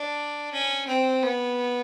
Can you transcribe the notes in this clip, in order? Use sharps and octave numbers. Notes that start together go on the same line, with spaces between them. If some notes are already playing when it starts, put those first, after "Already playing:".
Already playing: D4
C#4
C4
B3